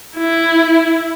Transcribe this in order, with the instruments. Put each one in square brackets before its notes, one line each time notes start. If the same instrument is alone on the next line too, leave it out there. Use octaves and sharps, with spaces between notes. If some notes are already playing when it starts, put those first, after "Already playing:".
[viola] E4